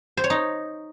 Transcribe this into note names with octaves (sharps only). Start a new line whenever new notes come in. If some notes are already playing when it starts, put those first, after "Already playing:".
C5
C#5
D#4